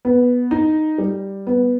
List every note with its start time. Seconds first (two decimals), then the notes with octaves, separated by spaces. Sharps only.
0.05 B3
0.51 D#4
0.98 G3
1.47 B3